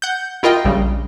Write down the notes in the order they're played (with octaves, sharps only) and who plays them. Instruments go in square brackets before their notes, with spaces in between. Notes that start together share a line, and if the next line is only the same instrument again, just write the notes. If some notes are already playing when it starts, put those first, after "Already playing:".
[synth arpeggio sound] F#5 G6
E4 F4 A#4 D#5 G5
A#1 C#3 G3